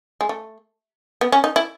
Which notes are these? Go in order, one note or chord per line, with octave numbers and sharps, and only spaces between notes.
G#3
A3
B3
C#4
D#4
E4